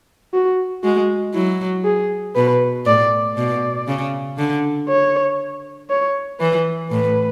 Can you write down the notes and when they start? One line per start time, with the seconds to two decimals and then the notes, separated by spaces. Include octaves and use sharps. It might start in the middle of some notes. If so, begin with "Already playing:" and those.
0.34 F#4
0.84 G#3 F#4
1.34 F#3 E4
1.85 G#4
2.36 B2 B4
2.86 A2 D5
3.37 B2 D5
3.87 C#3
4.38 D3
4.89 C#5
5.90 C#5
6.40 E3 B4
6.91 A2 B4